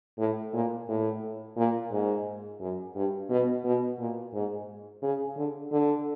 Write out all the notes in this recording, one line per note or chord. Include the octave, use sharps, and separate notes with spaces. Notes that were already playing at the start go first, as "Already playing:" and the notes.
A2
A#2
A2
A#2
G#2
F#2
G2
B2
B2
A#2
G#2
C#3
D3
D3